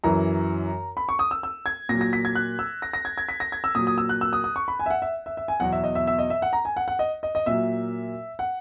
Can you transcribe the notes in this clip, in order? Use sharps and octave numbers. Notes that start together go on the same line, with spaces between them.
F#2 E3 A#5
B5
C#6
D#6
E6
E6
G#6
A#2 F#3 A#6
A#6
B6
G#6
F#6
E6
A#6
A#6
G#6
G#6
B6
A#6
G#6
E6
A#2 F#3 D#6
D#6
E6
F#6
E6
D#6
D#6
C#6
B5
G#5
E5
F#5
E5
E5
E5
G#5
E2 B2 F#3 F#5
E5
D#5
E5
E5
D#5
E5
F#5
A#5
G#5
F#5
F#5
D#5
D#5
D#5
A#2 F#3 E5
F#5